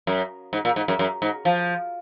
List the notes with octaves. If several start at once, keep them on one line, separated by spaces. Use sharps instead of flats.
F#2
G#2
A#2
G#2
F#2
F#2
G#2
F3